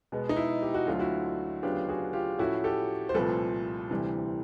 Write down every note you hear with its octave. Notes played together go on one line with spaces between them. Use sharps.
B2 G#3 B3
D#4
E4
G4
F#4
D2 D3 F#3 A3 F4
E4 F#4
D2 C#3 F#3 B3 D4 F4 G4
F#4 G#4
F4 G4
A2 F3 A3 C#4 E4 F#4
G4 A4
C5
C2 A#2 F3 A3 C4 A4 B4
D2 C3 E3 G3